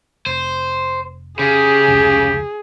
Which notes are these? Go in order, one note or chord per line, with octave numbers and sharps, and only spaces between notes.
F1 C5
C#3 G4 G#4
F1 C#2